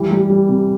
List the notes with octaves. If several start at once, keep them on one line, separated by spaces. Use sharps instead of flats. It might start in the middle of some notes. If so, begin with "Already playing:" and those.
Already playing: E3 G3
G3
G3
C3